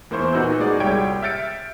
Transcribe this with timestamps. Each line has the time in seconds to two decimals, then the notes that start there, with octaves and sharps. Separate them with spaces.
0.11 E2 A#3 E4 C5 C#6
0.33 A#2 D#4 F#4 B4 E6 G6
0.58 G#3 A#3 F#4 G#4 D5
0.80 C2 G3 C#5 G5 G#6 D7
1.22 E5 F6 G6 A6 C#7 D7